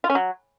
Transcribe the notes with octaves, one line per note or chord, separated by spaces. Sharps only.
F4
C#4
F#3